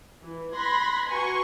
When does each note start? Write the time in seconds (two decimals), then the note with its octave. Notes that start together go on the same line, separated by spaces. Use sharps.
0.23 E3
0.55 B5 C6 F#6 G#6 A#6
1.09 F#4 B4 G#5 A#5 C6 C#6